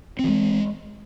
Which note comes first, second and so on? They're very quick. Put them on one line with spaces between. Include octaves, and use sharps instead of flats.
C4 E3 G#3